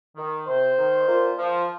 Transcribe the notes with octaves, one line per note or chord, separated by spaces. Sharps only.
D#3
C3 C5
D#3
A#2
F3